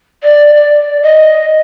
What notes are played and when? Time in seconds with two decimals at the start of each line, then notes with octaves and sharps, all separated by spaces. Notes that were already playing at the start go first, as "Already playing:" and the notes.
0.23 D5
0.55 D5
1.03 D#5